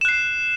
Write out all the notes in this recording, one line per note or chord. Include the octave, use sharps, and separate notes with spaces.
F#6 C7 E7